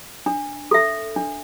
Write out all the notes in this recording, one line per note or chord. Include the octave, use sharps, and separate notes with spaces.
D4
A4 E5
D4